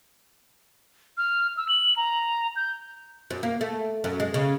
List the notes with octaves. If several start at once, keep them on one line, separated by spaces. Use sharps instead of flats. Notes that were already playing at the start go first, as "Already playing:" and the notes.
F6
E6
F#7
A#5
G6
F#2
A#3
A3
F#2
G#3
C#3